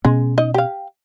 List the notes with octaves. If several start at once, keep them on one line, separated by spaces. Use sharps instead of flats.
B2 G#3 B3 C#4
D#4 D#5
G4 F5